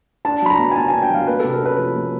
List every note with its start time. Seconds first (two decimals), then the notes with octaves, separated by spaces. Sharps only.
0.25 D4 A5
0.42 F#3 B5
0.50 A#5
0.59 B3
0.72 G#5
0.76 B3 A5
0.88 G#5
0.93 D4
1.02 G5
1.10 F#3 F5
1.27 A#3 B4
1.40 A4
1.44 C3
1.53 A#4
1.61 C#4 B4
1.78 F3
1.95 A#3